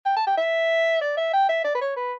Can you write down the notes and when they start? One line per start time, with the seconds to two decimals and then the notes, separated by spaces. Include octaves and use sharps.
0.05 G5
0.16 A5
0.27 G5
0.37 E5
1.01 D5
1.17 E5
1.33 G5
1.49 E5
1.64 D5
1.75 B4
1.81 C#5
1.97 B4